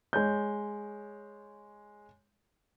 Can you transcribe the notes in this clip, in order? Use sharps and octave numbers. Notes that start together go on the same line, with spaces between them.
G#3 C#5 G6